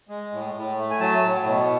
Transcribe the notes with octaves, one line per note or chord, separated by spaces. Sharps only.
G#3
A2
A2
A3
G#5
F#3 A5
A2
B2